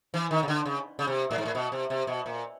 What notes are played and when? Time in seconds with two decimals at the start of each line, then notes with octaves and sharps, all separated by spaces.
0.14 E3
0.31 D#3
0.43 C#3
0.48 D3
0.66 C#3
0.99 C#3
1.07 C3
1.31 A2
1.38 G#2
1.45 A2
1.55 B2
1.72 C3
1.90 C3
2.07 B2
2.26 A#2